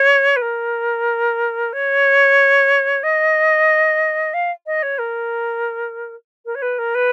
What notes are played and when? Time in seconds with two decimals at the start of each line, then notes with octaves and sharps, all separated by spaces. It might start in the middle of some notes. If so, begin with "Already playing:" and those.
Already playing: C#5
0.36 B4
0.42 A#4
1.73 C#5
3.03 D#5
4.34 F5
4.66 D#5
4.83 C#5
4.98 A#4
6.46 A#4
6.55 C#5
6.62 B4
6.78 A#4
6.95 B4